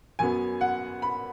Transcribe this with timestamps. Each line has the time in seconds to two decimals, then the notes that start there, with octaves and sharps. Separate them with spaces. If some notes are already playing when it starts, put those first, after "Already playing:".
0.19 F#2 F#3 B3 G#5
0.61 F#5
1.02 B5